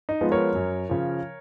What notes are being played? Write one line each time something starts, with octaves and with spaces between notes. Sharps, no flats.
D#4
F3 G#3 B3
A#4 C#5
F#2
C#3 F3